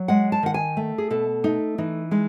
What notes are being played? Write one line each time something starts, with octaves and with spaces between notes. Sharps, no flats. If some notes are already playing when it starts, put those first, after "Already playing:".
Already playing: F#3
G#3 F#5
A5
D#3 F#5
G#5
A3
G#4
B2 A4
A3 D#4
E3 D#4
G#3 D#4